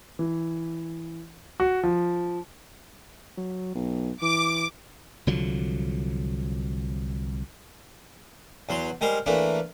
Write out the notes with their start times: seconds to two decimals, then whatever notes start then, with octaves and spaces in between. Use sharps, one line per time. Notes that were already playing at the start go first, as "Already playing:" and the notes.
0.19 E3
1.60 F#4
1.83 F3
3.37 F#3
3.75 B1
4.22 E3 D6
5.27 C2 D3 F3 F#3
8.69 E2 F#3 C6
9.01 G3 G#3 A#4 C5
9.26 E3 A3 A#3 D4